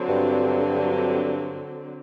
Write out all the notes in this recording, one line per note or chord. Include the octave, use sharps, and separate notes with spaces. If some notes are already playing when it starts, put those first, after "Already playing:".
Already playing: D3 F#3 C4
G2